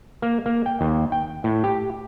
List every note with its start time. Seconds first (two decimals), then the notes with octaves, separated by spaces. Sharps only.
0.22 A#3
0.46 A#3
0.66 G5
0.81 D#2
1.12 G5
1.44 A2
1.64 G4